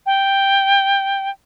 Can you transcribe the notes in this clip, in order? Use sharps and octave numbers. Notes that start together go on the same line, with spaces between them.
G5